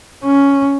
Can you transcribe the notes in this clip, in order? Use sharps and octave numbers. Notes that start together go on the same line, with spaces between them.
C#4